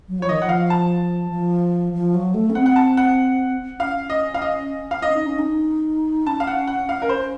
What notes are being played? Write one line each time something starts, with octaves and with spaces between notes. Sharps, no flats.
F#3
F3 C#5
D#3 D#5
F3 F#5
F5
A5
F3
F3
F#3
A3
C#4
C4 F#5
F#5
A5
F#5
C#4 F5
D#5
F5
D#5
F5
D#5
D#4
C#4
D#4
C#4 A5
F5
F#5
F#5
F5
A#4
C5